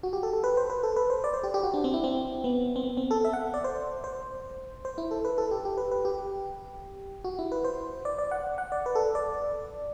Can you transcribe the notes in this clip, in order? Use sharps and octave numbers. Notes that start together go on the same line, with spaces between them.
F#4
G4
A4
A4
B4
C5
B4
A4
B4
C5
D5
C5
G4
G4
F#4
D4
C4
E4
C4
B3
C4
B3
C4
A4
E5
F#5
D5
C5
C5
C5
E4
A4
B4
A4
G4
G4
B4
B4
G4
F#4
E4
B4
C5
D5
D5
F#5
F#5
D5
B4
A4
D5